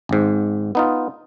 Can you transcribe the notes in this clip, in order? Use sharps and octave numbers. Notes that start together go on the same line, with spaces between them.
G#1 G#2
B3 D#4 F4